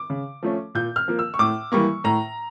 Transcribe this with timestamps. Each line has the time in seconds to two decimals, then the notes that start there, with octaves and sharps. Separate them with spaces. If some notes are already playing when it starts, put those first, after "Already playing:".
Already playing: D6
0.10 C#3
0.43 F3 A3 C#4
0.75 A#2 G6
0.96 F6
1.08 F3 A#3
1.19 E6
1.34 C#6
1.39 A2 D6
1.72 E3 G3 A#3 C#6
2.04 A2 A#5